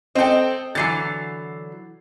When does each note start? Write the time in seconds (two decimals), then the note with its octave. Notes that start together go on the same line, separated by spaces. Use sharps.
0.15 C4 A4 D#5 G5
0.75 D3 E3 F#3 A6 C7